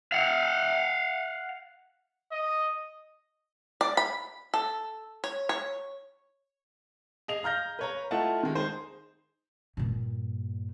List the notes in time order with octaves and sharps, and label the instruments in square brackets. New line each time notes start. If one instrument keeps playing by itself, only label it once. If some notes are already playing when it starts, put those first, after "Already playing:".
[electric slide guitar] F5 F#5
[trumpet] D#5
[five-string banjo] D5
B5
A4
C#5
C#5
[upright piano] G#4 D#5 F7
F5 A#5 F6 G6 A#6
B4 C#5 A#5
A3 E4 F4 D#5 F#5 A5
D#3 G#3
D#4 G#4 C5
[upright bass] G2 A#2